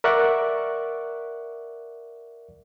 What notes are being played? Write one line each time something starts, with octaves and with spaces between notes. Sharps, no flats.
A#4 D5 E5 F#5 C#6 F#6